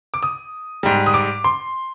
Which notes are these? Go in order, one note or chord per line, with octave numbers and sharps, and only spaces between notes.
D6
D#6
G#2 G3
D#6
D6
C6